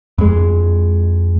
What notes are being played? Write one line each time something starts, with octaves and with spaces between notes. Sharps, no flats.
F2 G#3